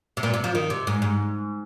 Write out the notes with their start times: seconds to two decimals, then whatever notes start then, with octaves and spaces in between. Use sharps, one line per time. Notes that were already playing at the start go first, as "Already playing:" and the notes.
0.17 C3
0.23 A#2
0.34 C3
0.44 F3
0.55 D#3
0.70 C3
0.87 G#2
1.02 G#2